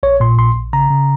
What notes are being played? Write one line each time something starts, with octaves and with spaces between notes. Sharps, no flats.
A#1 C#5
A#2 C6
A#1 C6
A#1
C#3 A#5
C#3